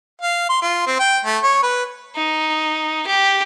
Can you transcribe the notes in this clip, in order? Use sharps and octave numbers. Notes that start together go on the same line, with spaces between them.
F5
C6
F4
C4
G5
A3
C#5
B4
D#4
G4